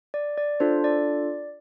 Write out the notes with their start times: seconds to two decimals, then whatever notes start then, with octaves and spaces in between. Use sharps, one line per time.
0.14 D5
0.38 D5
0.60 D4 F4 A4 C5
0.84 D5